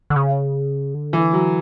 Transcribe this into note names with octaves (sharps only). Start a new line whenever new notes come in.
D3
C#3
D3
E3
F#3